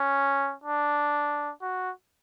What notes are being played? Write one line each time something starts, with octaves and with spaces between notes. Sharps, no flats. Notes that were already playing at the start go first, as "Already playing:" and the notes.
Already playing: C#4
D4
F#4